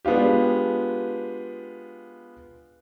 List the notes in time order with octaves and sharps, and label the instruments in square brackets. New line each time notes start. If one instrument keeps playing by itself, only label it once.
[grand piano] G#3 B3 D4 F4 G4